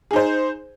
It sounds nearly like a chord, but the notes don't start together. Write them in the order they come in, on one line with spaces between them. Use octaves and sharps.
G#4 D#4 C5